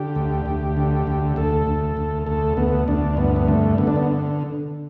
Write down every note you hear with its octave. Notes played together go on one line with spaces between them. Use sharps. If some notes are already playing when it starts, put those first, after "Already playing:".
Already playing: D3 G4
D2
D2
D3
D2
D2 A4
D2
D2
D2 A4
D2 B3
D2 D4
G2 B3
B3
D3 A3
D3 B3
D4
B3